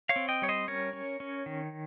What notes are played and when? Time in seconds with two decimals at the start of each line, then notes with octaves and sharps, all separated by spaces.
0.09 C#5 F5
0.16 C4
0.28 D#5 G5
0.42 G3 C#5
0.49 C5 D#5
0.68 C#4 A#4 C#5
0.93 C#4
1.20 C#4
1.46 D#3